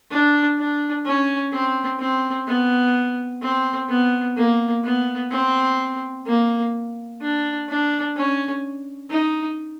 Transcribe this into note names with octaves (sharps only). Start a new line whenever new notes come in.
D4
D4
C#4
C4
C4
B3
C4
B3
A#3
B3
C4
A#3
D4
D4
C#4
D#4